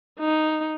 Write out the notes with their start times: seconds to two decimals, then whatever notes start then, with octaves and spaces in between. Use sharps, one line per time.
0.19 D#4